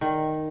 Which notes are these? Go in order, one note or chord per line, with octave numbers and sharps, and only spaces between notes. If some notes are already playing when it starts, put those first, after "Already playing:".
D#3